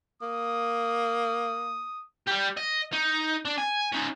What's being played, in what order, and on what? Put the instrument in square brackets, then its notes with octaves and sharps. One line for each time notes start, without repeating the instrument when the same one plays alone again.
[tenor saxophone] A#3 [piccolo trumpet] D#6
[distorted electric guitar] G3 G4
D#5
D#4
D4
G#5
C#4 D#4